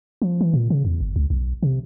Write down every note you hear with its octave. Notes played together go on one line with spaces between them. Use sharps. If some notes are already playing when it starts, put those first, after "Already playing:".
F3
E3
A#2
C#3
E2
G1
C#2
B1
C3